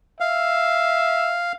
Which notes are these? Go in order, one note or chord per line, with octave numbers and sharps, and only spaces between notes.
E5 F5